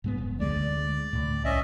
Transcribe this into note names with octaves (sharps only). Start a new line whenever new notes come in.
G#2 G#3 B3
F1
D2 G#3 D5
D2 A2
C2 C#4 D#5 E5